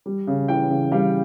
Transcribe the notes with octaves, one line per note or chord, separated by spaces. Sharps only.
G3
C#3
E3 G5
C#3
G3 F5